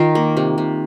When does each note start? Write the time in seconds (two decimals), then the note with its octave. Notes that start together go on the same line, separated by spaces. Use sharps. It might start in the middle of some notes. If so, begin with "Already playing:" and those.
Already playing: D#3 D#4 F4
0.15 A#3
0.37 C3
0.58 C3